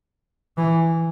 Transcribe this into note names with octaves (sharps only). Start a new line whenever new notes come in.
E3